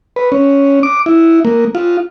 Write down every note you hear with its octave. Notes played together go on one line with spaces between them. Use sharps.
B4
C#4
D6
E4
A#3
F4